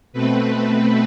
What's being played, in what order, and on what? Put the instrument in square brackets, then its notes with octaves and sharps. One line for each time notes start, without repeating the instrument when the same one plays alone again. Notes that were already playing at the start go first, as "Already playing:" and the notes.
[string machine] B2 A3 C4 B4